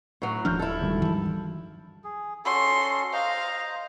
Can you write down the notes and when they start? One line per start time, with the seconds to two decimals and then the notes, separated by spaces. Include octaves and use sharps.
0.22 A2 F#3
0.45 D#1 F3 D4 F6 G6
0.59 E4 A4
0.81 G#1 G2
1.02 E3 F3
2.04 G#4
2.45 C#4 F#4 A4 C6
3.13 C5 D#5 F5 A#5